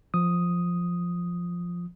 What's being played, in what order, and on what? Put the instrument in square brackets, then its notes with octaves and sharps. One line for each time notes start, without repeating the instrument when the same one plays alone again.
[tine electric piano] F3 D#6